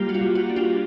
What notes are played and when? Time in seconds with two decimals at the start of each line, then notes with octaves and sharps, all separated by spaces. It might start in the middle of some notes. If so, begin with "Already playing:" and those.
Already playing: G3 A#3 F4 G4
0.09 F#4
0.14 F4
0.21 G3
0.35 F#4
0.49 D4
0.56 F4 G4